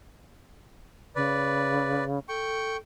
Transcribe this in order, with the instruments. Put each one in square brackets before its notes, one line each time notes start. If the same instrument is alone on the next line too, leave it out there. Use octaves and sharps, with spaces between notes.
[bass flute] C#3 [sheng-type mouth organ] B4 D5
[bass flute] A4 [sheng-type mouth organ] G5 C#6